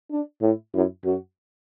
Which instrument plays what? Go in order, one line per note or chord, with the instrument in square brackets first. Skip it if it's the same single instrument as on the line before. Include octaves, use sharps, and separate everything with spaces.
[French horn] D4
[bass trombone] A2 [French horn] E4
[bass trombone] F#2 [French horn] E4
[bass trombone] F#2 [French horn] F#4